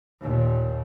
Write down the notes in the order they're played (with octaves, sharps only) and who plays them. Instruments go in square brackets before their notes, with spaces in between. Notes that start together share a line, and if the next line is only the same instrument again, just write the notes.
[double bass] D#2 A#2